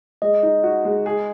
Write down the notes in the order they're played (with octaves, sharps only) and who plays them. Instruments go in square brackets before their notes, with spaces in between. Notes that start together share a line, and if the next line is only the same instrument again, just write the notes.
[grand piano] G#3 [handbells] D#5
[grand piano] D#4
F#4
G#3
G#4